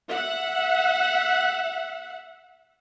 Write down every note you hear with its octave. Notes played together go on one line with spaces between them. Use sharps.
E5 F#5